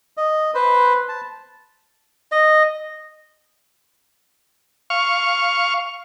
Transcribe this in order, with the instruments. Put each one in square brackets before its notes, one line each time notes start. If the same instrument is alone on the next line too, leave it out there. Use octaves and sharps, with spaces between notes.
[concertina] D#5
B4 C5
A5
[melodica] D#5
[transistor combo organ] F5 C#6